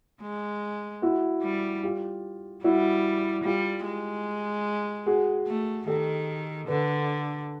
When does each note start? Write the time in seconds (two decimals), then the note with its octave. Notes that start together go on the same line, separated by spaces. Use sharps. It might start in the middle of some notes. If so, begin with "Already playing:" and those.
0.22 G#3
1.02 E4 F#4
1.42 G3
1.83 F4 G4
2.64 G3 E4 F#4
3.44 G3 F4 G4
3.85 G#3
5.06 F#4 G#4
5.47 A3
5.87 D#3 G4 A4
6.68 D3 A4 B4